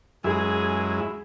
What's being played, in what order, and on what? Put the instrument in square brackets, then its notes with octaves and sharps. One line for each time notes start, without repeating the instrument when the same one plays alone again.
[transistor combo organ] F#2 G#3 E4 [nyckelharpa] G#4